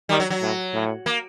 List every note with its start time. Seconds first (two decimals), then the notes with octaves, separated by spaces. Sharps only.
0.09 D#3 G3
0.20 F#3
0.30 F#3
0.42 A2
0.73 A2
1.06 A#3